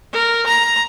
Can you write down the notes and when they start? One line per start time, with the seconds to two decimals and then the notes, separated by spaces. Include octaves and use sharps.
0.13 A#4
0.47 A#5